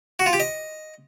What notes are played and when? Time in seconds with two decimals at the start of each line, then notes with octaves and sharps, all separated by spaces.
0.19 F#4
0.26 F4
0.33 G4
0.40 D#5